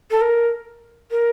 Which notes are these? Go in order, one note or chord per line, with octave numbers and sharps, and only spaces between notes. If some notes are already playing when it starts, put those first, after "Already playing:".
A4
A#4
A#4